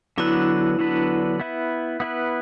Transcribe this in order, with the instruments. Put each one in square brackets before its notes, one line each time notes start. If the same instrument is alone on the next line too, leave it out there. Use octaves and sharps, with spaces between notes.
[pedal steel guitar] D3 F#3 B3 D4 B4 [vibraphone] E4
[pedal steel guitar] D3 F#3 B3 D4 B4
B3 E4 B4
B3 E4 B4